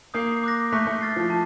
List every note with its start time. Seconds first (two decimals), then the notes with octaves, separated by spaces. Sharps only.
0.14 A#3 D#6 G6 C7
0.44 D6 F#6 A#6
0.72 A3 C#6 F#6 B6
0.87 A3
1.01 F6 A6 C7
1.16 F3
1.30 A5